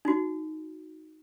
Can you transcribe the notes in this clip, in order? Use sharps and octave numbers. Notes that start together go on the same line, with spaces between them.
D#4 F#4